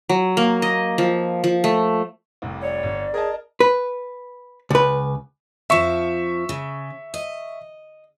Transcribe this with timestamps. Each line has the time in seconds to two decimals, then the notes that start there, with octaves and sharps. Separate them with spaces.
0.09 F#3
0.37 A#3
0.62 D#5
0.98 F3
1.44 F3
1.64 A3
2.42 F1 C2
2.63 C#5 D5
2.83 G1
3.14 G#4 A#4 D#5 A5
3.60 B4
4.70 C#2 B4
5.70 F2 F3 E5 C#6 E7
6.49 C#3
7.14 D#5